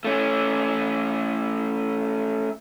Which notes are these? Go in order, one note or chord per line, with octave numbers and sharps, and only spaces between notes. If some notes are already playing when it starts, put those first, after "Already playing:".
A3 C#4